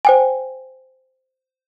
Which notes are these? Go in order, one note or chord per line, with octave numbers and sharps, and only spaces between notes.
C5 G5 G#5